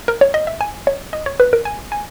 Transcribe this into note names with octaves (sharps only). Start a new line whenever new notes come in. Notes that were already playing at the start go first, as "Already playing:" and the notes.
A#4
C#5
D#5
E5
G#5
C#5
D#5
C#5
B4
A#4
G#5
G#5